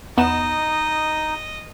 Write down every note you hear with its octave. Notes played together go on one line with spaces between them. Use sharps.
E2 B3 D#4 D#5 E7